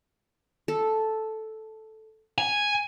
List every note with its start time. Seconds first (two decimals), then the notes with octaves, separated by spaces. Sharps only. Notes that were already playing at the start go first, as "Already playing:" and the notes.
0.68 A4
2.38 G#5